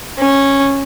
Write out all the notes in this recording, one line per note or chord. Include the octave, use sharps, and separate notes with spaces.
C#4